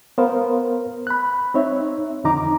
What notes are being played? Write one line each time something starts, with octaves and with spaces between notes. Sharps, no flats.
B3 A#4 C5 F5
B5 F#6
C4 D#4 C#5 E5
F2 D3 D#4 A#5 D6